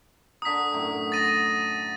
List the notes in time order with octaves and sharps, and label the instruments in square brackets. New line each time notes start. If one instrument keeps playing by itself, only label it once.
[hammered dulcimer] D3 A#5 [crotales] D#6 B6
[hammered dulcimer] F#2 A2 A#5
[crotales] A6 A#6 D#7